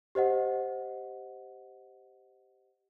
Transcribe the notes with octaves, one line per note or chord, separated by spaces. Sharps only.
G4 C5 D#5 F#5